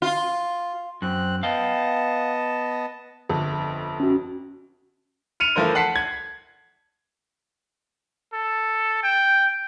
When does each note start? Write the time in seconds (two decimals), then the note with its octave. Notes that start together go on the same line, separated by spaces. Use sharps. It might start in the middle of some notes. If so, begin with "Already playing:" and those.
0.02 F4
1.02 F#2 C4 F#6
1.43 B3 D#5 F5 G5 A5
3.29 G1 F2
4.00 C#4 F#4
5.40 F6 C#7 D#7 F7
5.56 E3 F3 A3 A#4 C5
5.75 F#5 A5 B6 C7
5.96 G#6
8.34 A4
9.03 G5